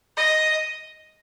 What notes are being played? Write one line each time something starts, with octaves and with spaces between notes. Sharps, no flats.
D#5